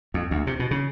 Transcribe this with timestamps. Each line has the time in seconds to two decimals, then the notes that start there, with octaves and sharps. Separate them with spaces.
0.14 F2
0.31 D2
0.47 C3
0.59 B2
0.71 C#3